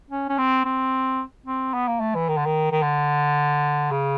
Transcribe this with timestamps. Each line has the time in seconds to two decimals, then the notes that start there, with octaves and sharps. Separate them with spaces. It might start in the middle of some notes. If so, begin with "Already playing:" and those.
0.11 C#4
0.30 C#4
0.38 C4
0.65 C4
1.46 C4
1.74 B3
1.88 A#3
2.01 A3
2.15 E3
2.29 D#3
2.37 D3
2.46 D#3
2.72 D#3
2.82 D3
3.91 C#3